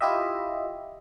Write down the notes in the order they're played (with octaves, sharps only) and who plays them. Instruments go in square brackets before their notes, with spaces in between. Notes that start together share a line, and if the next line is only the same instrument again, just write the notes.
[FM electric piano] E4 F4 G4 D#5 E5